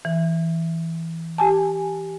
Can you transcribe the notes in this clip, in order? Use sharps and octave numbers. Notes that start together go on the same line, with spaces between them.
E3
G4 G#5 A5